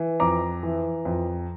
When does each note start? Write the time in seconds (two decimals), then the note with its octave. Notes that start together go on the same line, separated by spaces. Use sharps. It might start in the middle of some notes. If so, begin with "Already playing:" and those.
Already playing: E3
0.20 F2 A#5 D6
0.63 E3
1.05 F2